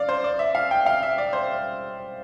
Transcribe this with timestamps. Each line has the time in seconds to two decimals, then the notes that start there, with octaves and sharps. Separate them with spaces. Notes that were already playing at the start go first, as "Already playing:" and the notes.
Already playing: D5 F5
0.09 C5
0.24 D5
0.39 E5
0.55 F5
0.71 G5
0.86 F5
1.03 E5
1.18 D5
1.33 C5